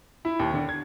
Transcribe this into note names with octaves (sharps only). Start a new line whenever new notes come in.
E4
D#2
D3
G#6